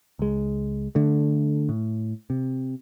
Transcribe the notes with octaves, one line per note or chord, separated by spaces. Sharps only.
C#2 G#3
D3 A3
A2
C3